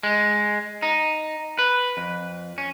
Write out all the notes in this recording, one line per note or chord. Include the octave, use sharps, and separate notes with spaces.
G#3
D#4
B4
F2
C#4